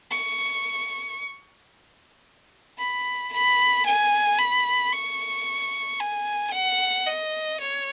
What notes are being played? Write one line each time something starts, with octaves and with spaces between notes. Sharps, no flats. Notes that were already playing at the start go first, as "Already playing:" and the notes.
C#6
B5
B5
G#5
B5
C#6
G#5
F#5
D#5
C#5